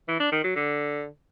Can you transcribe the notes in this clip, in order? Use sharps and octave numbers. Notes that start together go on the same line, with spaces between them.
E3
D4
D#3
F#3
D3